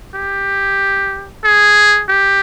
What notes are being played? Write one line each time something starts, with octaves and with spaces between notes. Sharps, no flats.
G4
G#4
G4